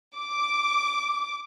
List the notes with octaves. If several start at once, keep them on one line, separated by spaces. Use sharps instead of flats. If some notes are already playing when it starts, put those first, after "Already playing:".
D6